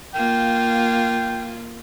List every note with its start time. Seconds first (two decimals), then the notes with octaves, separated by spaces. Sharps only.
0.14 A#3 F4 G5